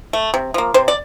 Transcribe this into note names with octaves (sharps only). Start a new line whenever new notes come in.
A3
C3
F3 A#3
C3 C5
D5